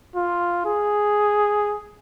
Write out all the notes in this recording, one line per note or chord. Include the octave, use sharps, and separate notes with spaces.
F4
G#4